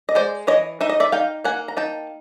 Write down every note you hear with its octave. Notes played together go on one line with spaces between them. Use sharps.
D#5
G#3 C5 D5
E3 C#5 D#5
D#4 E5
D#5
D5 E5
D#4 F5 G5
A#3 F#5 G#5
A#5
D#4 G5 A5